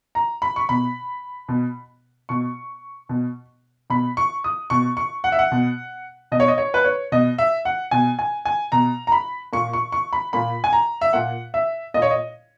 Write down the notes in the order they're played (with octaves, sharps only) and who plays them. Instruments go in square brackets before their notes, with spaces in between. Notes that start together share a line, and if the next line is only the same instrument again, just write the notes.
[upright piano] A#5
B5
C#6
B2 B5
B2
B2 C#6
B2
B2 B5
C#6
D#6
B2 C#6
C#6
F#5
E5
F#5
B2
B2 D#5
C#5
D#5
C#5
B4
C#5
B2 D#5
E5
F#5
B2 G#5
G#5
G#5
B2 A#5
A#5
B5
A#2 C#6
C#6
C#6
B5
A#2 B5
G#5
A#5
E5
A#2 F#5
E5
A#2 D#5
C#5
D#5